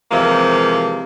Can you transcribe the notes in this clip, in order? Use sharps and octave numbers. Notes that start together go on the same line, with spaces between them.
C3 E3 F3 G#3 A#3